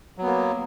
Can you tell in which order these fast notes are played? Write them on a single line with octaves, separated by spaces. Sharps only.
F#3 B3 A#3